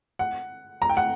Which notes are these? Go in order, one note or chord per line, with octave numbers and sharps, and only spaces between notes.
F#5
A#5
G5
F#5